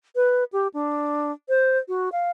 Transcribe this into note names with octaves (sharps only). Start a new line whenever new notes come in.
B4
G4
D4
C5
F#4
F5